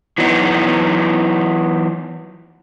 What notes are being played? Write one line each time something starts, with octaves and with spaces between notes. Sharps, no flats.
E3 F#3 B3 D#4